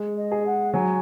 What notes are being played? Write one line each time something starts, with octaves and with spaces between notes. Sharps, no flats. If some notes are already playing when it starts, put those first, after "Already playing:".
Already playing: G#3
D#5
G#4
F#5
F#3 G#5